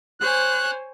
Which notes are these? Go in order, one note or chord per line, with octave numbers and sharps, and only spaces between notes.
C5 C#5 G#5 F#6